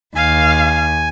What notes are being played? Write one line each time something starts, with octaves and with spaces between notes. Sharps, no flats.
D#2 F5 G#5